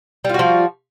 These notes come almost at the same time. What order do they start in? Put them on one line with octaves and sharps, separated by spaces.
G3 F4 F#4 F3